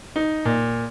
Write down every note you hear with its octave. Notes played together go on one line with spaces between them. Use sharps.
D#4
A#2